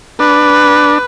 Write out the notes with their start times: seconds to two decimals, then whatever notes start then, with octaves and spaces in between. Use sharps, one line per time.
0.20 D4 B4